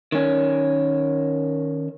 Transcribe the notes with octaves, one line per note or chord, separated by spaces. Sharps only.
D#3 C#4